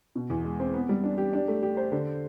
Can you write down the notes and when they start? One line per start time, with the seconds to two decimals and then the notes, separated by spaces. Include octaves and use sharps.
0.15 B2
0.30 E2
0.44 G#3
0.60 C4
0.74 B3
0.89 G3
1.04 D4
1.18 G4
1.33 D4
1.48 A3
1.63 G4
1.77 C5
1.92 D3